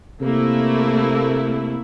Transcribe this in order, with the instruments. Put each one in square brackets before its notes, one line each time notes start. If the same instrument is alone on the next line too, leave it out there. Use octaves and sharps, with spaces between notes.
[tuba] C3 [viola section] A3 A#3 E4